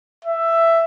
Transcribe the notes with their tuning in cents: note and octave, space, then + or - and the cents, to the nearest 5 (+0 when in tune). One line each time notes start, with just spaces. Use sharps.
E5 +10